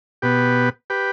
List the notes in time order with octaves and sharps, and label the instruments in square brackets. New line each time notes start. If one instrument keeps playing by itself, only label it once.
[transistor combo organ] B2 B3 G4 B4
G4 B4